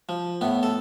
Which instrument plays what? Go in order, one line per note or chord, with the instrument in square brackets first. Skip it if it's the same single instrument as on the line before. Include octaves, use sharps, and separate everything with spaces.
[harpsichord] F3
A2 B3
A4